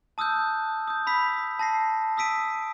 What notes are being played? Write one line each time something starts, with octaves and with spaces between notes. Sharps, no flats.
A5 D#6 E6 F#6 G6
D#6 G6
B5 E6 B6
A5 A#6 C7
D#6 E6 B6 D7 D#7